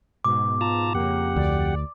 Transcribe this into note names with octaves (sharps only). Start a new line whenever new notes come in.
G#2 B2 D6
F4 A5 A#5
F2 C#3 A#3 G4 F#5
D2 D5